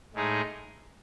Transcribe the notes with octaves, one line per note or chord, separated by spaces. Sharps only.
A2 G#3 D#4 G#4